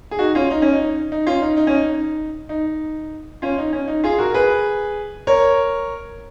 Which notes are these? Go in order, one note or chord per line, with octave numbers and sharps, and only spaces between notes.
G#4
D#4 F#4
C#4 F4
D#4
C#4
D#4
D#4
C#4 F4
D#4
D#4
C#4
D#4
D#4
C#4 F4
D#4
C#4
D#4
F4 G#4
F#4 A#4
G#4 B4
A#4 C#5